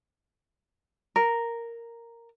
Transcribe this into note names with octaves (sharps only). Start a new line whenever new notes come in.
A#4